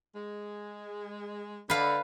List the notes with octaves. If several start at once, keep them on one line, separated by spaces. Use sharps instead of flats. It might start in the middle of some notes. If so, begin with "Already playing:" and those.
G#3
D3 B4 F5